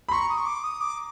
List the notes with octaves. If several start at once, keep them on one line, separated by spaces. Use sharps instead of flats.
B5
A#5 C6 C#6
D#6
C#6
D6
D#6
D6